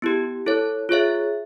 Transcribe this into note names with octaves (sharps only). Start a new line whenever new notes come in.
B3 E4 G4
E4 A4 C#5
F4 G#4 C#5 E5